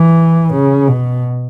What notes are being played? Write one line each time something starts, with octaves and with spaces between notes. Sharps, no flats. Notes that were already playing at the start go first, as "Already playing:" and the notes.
Already playing: E3
C#3
B2